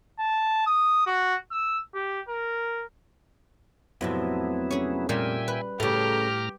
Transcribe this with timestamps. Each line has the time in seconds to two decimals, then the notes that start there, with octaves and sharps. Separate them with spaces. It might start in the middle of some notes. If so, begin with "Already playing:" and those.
0.20 A5
0.67 D#6
1.06 F#4
1.51 E6
1.95 G4
2.29 A#4
4.01 F2 A2 C3 F#3 B3 E4
4.71 C#4 G#4
5.09 A#2 G3 A#3 E5 G5 G#5
5.48 B4
5.80 A2 C#3 A3 G4 A#5 F6